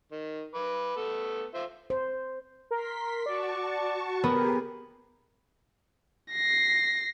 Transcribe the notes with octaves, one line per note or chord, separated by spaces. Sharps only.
D#3
B4 D6
A3 B3 A4
F4 C5 E5
C5
A#4 C6 B6
F#4 D5 A5 C#6
B3 G4 G#4 A#4
A#6 C7